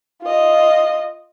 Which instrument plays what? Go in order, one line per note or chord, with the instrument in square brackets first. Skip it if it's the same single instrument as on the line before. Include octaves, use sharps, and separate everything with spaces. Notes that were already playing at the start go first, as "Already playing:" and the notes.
[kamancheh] F4 D#5